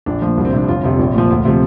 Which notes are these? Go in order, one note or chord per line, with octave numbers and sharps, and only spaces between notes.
A#1 D4
A#2 F3
C2
C4
C3 F3 D4
G1 F4
F2 C3
A#1
A#2 F3
D2
C3 F3